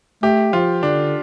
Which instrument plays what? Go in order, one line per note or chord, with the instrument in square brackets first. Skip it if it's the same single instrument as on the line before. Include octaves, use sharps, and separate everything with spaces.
[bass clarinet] A3 [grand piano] G4
[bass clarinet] F3 [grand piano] F4
[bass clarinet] D3 [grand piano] D4